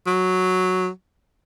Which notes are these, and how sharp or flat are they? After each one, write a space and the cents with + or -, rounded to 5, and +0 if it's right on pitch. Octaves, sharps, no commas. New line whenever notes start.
F#3 -5